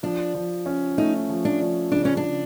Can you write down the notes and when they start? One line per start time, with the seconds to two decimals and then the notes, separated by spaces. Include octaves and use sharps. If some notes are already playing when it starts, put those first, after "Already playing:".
0.03 F3 D4
0.35 F3
0.66 C#4
0.98 A3 D#4
1.29 F3
1.45 D4
1.61 F3
1.92 C#3 D4
2.05 C#4
2.17 D4
2.24 C#3